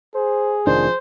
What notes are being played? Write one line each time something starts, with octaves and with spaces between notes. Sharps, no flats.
G#4 C5
F1 D#3 F3 D4 C5